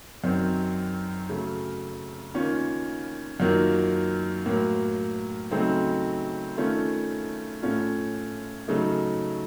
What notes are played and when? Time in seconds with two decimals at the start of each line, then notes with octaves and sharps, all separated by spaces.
0.24 F#2 D#3 F#3 C4
1.29 C#3 F#3 A3
2.34 D#3 A#3 C#4 F4
3.40 F#2 D#3 F#3 A#3 F4
4.45 A2 F#3 A#3
5.51 C#3 F#3 A3 C4 D#4
6.57 D#3 A3 C#4 F4
7.62 A2 A3 C#4 F4
8.68 C#3 F#3 A3 D#4